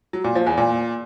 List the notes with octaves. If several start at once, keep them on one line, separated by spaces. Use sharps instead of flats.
F#3
A#2
F3
E2
A#2